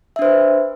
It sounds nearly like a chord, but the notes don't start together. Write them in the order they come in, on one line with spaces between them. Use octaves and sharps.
E5 D4 C5 B4